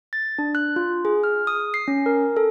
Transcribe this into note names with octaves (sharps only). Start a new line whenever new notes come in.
A6
D4
F#6
F4
G#4
F6
D#6
C7
C#4
A#4
A4